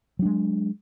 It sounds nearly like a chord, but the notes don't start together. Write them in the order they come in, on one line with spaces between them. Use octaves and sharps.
F#3 D4 G#3